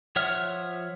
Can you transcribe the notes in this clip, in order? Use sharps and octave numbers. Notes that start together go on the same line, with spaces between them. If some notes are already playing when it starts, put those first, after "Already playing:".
F3 C#5 E5 F#5 F6